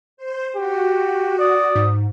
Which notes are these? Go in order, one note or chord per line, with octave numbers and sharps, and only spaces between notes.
C5
F#4 G4
D5 D#6
G#2